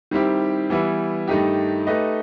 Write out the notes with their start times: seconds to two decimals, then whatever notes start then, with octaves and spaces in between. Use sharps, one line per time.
0.11 D#3 G3 C4 E4 G4
0.70 E3 G3 B3 E4
1.28 G2 D#3 A3 D#4 G4
1.87 A3 D#4 G4 B4 D#5